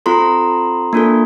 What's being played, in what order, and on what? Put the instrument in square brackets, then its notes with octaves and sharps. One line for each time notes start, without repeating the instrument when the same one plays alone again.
[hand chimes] C4 F4 A4 A#5 C6
A#3 D4 F4 A4